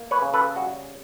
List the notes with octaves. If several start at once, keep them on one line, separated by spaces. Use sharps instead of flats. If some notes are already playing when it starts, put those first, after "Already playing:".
Already playing: A#3
B4 C#5
C#3
A4 B4
G3 F#4 G#4